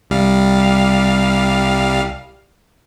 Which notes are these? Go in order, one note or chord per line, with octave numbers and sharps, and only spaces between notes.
C2 G3 F5